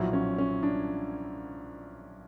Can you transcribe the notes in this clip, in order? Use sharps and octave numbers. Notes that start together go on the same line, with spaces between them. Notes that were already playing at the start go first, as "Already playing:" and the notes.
Already playing: B1 A#2 F3 E4 F#4
C#4
C#4
D4